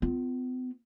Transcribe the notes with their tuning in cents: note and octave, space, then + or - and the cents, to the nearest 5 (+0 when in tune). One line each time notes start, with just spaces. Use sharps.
B3 +45 F4 +0